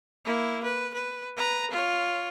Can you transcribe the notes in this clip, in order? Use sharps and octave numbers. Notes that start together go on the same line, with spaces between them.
A#3 E4
B4
B4
B4 A#5
F4 C#5